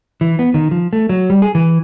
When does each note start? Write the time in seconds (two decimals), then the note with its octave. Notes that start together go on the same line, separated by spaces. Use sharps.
0.21 E3
0.39 B3
0.54 D#3
0.71 F3
0.93 A3
1.09 F#3
1.30 G3
1.42 G#4
1.55 E3